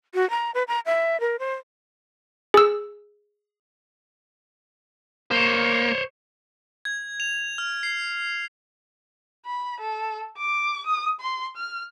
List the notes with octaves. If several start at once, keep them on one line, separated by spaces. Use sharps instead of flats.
F#4
A#5
B4
A#5
E5
A#4
C5
G#4 E6
A#3 C5 C#5
G#6
F7
F6
C7
B5
A4
D6
D#6
C6
F6